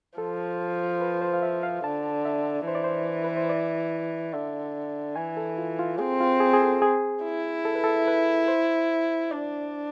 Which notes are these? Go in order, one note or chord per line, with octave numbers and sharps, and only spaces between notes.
F3 A4
B4
C5
F5
E5
F5
D3 A5
E5
E3 C5
D5
C5
B4
C5
D5
D3 E5
E3 G#5
A4
F4
F4
C4 G#4
F4
G#4
G#4
A4
G#4
E4
A4
B4
A4
B4
C5
D4 D5